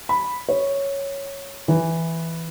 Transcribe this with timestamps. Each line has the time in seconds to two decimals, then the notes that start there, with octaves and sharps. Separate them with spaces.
0.09 B5
0.49 C#5
1.68 E3